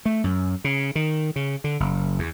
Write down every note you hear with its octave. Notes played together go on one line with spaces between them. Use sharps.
A3
F#2
C#3
D#3
C#3
D3
F#1
E2